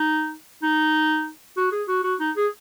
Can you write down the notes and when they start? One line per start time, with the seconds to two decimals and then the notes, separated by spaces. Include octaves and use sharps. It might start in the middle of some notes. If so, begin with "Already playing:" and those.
Already playing: D#4
0.63 D#4
1.58 F#4
1.72 G#4
1.88 F#4
2.04 F#4
2.20 D#4
2.36 G#4